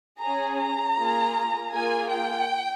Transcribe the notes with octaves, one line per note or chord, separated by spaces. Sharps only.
C#4 G#4 A#5
A#5
A#3 F4 G#4
A#3 F4 G#4 G#5
G5